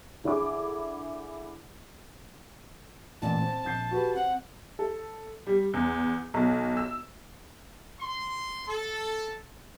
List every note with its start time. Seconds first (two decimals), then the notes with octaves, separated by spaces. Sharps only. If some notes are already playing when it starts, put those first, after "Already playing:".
0.24 D3 E4 G#4 D6
3.22 A1 A#2 D5 A5
3.42 C4
3.65 A#1 G6 C7
3.91 F#4 G4 B4
4.15 C4 F#5
4.79 A4
5.47 G3
5.74 E2
6.34 B1
6.77 E6
8.00 C6
8.68 A4